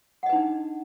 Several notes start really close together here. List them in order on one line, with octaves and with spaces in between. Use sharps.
F#5 D#5 B4 D#4 D4